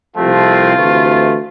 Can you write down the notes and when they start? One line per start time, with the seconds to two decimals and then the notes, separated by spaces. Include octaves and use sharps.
0.16 C2 C3 F3 A3 C4 F4
0.76 D2 C3 E3 A3